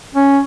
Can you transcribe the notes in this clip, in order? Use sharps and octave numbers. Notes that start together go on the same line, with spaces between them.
C#4